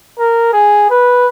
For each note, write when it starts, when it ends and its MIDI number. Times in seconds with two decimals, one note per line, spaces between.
0.18 0.50 70
0.53 0.86 68
0.90 1.27 71